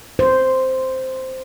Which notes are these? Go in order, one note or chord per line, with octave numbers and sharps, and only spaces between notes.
C5